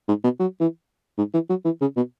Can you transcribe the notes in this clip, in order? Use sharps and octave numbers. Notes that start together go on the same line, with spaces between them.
G#2
B2
F#3
E3
G#2
E3
F#3
E3
C#3
B2